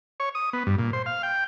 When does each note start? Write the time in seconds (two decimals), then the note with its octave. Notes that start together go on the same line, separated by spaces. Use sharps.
0.20 C#5
0.35 D#6
0.53 B3
0.67 G2
0.79 A#2
0.93 C5
1.06 F5
1.23 G5